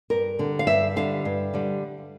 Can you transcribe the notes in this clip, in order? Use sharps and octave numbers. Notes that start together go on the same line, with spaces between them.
G2 A#4
D3 G3
F5
G2 E5
D3 G3 F5
G2
D3 G3